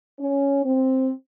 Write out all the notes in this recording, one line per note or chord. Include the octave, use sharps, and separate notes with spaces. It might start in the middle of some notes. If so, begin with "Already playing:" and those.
C#4
C4